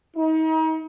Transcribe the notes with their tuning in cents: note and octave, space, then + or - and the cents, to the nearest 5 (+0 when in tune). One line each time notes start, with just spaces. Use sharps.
D#4 +35